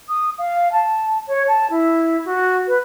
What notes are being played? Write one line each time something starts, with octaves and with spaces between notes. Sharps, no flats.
D#6
F5
A5
C#5
A5
E4
F#4
B4